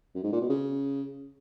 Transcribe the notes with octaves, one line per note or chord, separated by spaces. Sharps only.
F#2
G#2
A#2
B2
C#3